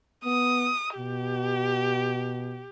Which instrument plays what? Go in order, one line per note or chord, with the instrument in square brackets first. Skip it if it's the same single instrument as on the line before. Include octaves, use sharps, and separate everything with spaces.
[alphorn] B3 [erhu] D#6
[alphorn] B2 [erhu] G4